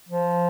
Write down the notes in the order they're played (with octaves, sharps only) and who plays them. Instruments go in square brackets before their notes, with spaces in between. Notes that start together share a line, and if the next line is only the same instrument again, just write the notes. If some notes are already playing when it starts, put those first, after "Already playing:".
[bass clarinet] F3